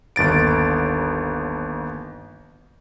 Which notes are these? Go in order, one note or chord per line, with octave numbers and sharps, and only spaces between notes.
G1 D#2 A6 D7